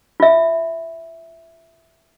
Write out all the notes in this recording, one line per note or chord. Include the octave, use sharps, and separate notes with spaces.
F4 E5